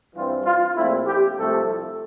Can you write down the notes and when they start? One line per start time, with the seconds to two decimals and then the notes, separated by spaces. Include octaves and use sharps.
0.15 G2 E3 G3 C4 F4
0.45 F4
0.75 A#1 A#2 A3 C4 E4
1.07 G4
1.37 C2 C3 F3 A3 A4